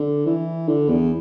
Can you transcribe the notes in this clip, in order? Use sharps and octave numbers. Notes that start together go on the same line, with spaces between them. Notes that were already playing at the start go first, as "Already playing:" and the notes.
Already playing: D3
E3
D3
E2